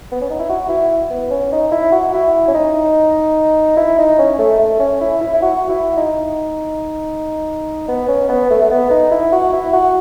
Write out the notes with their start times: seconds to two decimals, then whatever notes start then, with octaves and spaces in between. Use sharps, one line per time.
0.12 B3
0.21 C#4
0.30 D#4
0.39 E4
0.49 F#4
0.69 E4
1.10 B3
1.31 C#4
1.52 D#4
1.72 E4
1.92 F#4
2.14 E4
2.48 C#4
2.54 D#4
3.77 E4
3.99 D#4
4.19 C#4
4.39 A3
4.59 A3
4.80 C#4
5.01 E4
5.21 E4
5.34 E4
5.42 F#4
5.69 E4
5.97 D#4
7.88 B3
8.08 C#4
8.29 B3
8.50 A3
8.62 A3
8.71 B3
8.90 D#4
9.11 E4
9.33 F#4
9.53 E4
9.73 F#4